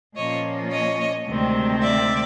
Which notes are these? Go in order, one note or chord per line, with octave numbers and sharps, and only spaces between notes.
A#2 F3 A#3 C#4 C#5 D#5
C#5 D#5
D2 C3 D#3 G#3 C4
D5 E5